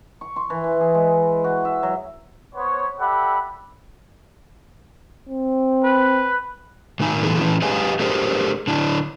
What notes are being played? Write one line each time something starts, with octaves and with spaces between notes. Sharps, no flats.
C#6
C6
E3
E3
G#4
G#3
F#4
E5
F#3
B3 C5 C#5
G4 A4 D5 E5 F#5 B5
C4
B4
A2 D#3 D#4 G#5
A#2 D#3 E3 D#4 G#4 A4
E3 C#4 E4
G4 G#4 B4 D#5 F5 G#5
A3 D4 G4 G#4 A#4 C5
D3 D4 E4